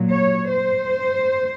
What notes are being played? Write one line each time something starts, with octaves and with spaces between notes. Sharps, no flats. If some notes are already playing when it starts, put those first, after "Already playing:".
Already playing: A#2 F#3
C#5
C5